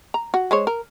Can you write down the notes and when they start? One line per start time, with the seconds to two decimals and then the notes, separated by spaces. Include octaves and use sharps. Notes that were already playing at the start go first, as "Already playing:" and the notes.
0.14 A#5
0.34 F#4
0.51 G#3 C5 C#5
0.67 A#4